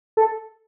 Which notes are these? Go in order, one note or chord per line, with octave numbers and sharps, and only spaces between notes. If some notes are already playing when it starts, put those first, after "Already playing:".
A4